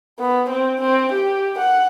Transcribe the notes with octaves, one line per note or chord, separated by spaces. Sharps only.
B3
C4
C4
G4
F#5